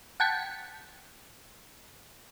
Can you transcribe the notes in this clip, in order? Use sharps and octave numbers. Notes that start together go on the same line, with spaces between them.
F#5 G5 A5 G#6 B6 C#7